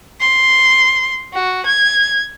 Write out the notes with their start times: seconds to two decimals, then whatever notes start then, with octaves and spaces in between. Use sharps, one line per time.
0.20 C6
1.34 F#4
1.66 G#6